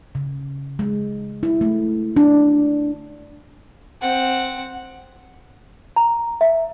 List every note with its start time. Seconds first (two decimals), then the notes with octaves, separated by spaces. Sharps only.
0.15 C#3
0.79 G#3
1.43 E4
1.61 A3
2.16 D4
4.02 C4 F#5
5.96 A#5
6.41 E5